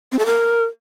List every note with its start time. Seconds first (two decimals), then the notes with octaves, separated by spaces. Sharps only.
0.12 C4
0.19 A4
0.26 A#4